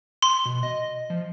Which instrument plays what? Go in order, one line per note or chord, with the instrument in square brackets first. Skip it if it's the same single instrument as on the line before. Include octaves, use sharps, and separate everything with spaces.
[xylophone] C6
[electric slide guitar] B2
D#5
F3